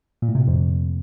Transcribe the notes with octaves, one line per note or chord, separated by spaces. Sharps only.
A#2
A2
C3
A#2
F2